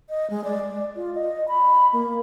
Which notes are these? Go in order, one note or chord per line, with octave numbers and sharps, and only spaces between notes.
D#5
G#3
D5
F4
D#5
B5
A#3